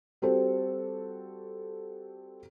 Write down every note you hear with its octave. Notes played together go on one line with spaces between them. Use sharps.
G3 C4 F#4 G4 A4 C5